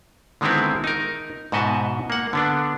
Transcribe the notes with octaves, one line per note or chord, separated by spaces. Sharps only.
D3 D#3 G#3 B3 C4 E4
D#4 A#4
G#2 B2 F#4 D#5 E5 A5
A#3 F#5
D3 B3 D4